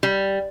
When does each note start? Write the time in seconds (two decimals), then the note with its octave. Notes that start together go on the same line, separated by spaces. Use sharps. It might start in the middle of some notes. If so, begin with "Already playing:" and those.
0.03 G3